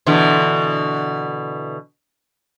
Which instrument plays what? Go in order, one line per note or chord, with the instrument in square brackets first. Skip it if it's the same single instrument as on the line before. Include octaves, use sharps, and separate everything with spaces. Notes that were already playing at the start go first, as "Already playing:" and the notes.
[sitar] B2 D3 E3